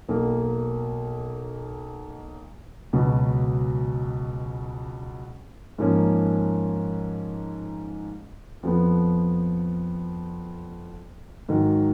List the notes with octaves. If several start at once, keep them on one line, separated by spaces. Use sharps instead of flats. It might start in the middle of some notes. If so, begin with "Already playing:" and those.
B1 B2 A#3
C#2 B2 F#3
G#2 F3 A#3 C#4
F2 F3 B3
G#2 D#3 F#3